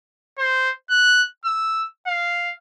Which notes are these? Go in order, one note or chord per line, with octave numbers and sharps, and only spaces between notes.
C5
F#6
E6
F5